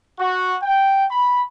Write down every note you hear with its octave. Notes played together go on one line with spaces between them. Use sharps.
F#4
G5
B5